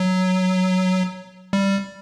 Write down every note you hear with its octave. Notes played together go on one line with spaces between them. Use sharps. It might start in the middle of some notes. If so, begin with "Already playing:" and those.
Already playing: F#3
G3